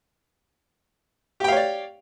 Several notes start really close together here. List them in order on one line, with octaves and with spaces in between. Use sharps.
G4 G5 F5 C#5 D5